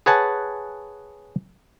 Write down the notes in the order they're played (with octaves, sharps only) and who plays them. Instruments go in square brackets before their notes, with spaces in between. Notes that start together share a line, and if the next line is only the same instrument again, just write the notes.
[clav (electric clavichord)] G#4 B4 C#5 F#5 G#5 A5